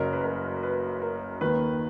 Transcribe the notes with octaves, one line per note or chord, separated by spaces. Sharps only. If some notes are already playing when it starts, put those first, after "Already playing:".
Already playing: F#1 F#2 C#3 A#4
B4
A#4
B4
A#4
D#2 D#3 B4